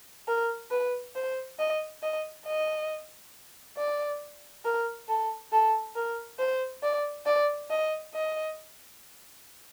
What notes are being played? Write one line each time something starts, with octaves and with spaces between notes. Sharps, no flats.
A#4
B4
C5
D#5
D#5
D#5
D5
A#4
A4
A4
A#4
C5
D5
D5
D#5
D#5